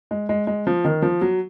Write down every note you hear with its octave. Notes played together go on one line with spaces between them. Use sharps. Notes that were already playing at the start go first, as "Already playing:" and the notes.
G#3
G#3
G#3
F3
D#3
F3
F#3